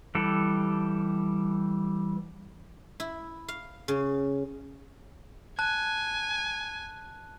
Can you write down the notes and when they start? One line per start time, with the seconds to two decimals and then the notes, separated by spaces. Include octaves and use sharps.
0.15 E3 G3 G4 A4
3.00 E4
3.48 F5
3.88 C#3
5.59 G#5 A5 F#6